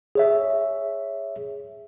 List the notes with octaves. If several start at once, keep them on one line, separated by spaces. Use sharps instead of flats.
G#4 C#5 E5